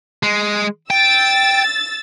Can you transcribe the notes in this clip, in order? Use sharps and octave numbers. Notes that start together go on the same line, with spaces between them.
G#3
G5 E6 A6